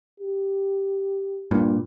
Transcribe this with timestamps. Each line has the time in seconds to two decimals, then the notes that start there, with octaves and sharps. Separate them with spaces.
0.20 G4
1.51 G2 A#2